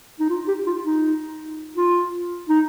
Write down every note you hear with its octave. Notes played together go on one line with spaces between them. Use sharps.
D#4
F4
G4
F4
D#4
F4
D#4